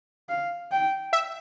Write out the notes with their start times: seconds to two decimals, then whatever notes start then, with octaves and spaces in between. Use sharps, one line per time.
0.29 F5
0.71 G5
1.13 E5